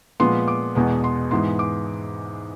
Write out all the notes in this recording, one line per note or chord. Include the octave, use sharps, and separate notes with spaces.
A#2 F3 G#3 B3 C6
D6
E2 B2 G#3 B3
C6
G#2 E3 G#3 B3 C6
D6